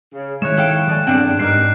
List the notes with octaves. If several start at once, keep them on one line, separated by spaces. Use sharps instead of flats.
C#3
D#3 G#3 E4 C#5 F#6 G#6 E7
A4 F5 G5
F3 D5 G#5
E2 G2 C4 D4 D5 F#5
G#2 G3 D#4 A#4 F#6 C7